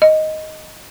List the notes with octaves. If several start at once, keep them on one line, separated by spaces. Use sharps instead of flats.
D#5